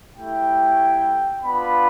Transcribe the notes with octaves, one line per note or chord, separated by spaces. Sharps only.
A3 E4 G4 G5
B3 D4 F4 B5